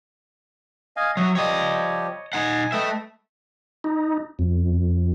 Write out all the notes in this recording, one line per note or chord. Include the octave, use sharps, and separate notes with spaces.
D#5 F5 G#5
F#3 E5 C#6 D#6
F3 G3 G4 C#5 D#5
D#4 F#5 G#5
A3 B4 D#5 E5 G5
D#4
F2